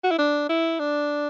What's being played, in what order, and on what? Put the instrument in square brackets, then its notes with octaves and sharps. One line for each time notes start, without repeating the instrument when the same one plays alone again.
[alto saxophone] F#4
E4
D4
E4
D4